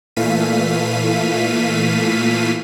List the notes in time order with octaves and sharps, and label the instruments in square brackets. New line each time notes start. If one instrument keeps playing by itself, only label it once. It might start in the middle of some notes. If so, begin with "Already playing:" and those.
[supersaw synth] A#2 E3 A3 F5 B6 D#7